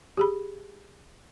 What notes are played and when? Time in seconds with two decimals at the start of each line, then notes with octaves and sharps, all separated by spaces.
0.17 G4 G#4 B5